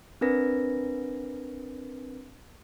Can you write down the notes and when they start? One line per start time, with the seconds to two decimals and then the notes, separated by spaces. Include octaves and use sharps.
0.21 C4 D4 A#4 B4 A#6